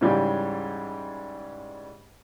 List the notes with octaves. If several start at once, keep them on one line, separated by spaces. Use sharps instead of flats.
G#2 C#3 E3 G3